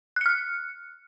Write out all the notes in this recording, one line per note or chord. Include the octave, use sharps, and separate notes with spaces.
F6 F#6 C#7